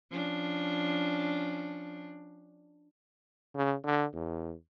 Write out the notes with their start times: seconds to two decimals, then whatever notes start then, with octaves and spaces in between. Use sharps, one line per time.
0.11 F3 C#4 D4
3.55 C#3
3.85 D3
4.13 E2